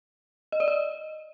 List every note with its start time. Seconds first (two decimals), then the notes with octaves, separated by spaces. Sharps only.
0.52 D#5
0.60 D5
0.68 D#5